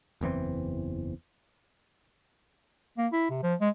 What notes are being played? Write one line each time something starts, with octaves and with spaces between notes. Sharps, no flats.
F#1 E2 E3 C4
A#3
E4
C3
F3
G#3